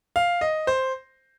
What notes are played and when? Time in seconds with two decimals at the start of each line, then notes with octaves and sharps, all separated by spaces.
0.16 F5
0.41 D#5
0.67 C5